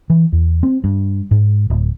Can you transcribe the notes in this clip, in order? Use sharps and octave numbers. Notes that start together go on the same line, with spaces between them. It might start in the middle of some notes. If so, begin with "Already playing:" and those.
E3
E2
C4
G2
G#2
D1